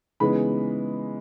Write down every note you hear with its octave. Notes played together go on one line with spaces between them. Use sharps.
C#3 E3 G#3 B3 D#4 B5